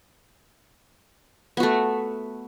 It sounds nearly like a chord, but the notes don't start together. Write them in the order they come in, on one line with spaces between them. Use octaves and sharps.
B3 F#4 A3